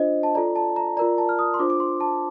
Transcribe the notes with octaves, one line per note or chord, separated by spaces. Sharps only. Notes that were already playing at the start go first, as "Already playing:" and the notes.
Already playing: D4 F4 C5 D#5
A5
F4 A4 D5 A#5
A5
A#5
F4 A#4 D5 A#5
A5
F6
D#6
C6
D4 F4 C5 D6
D6
C6
A5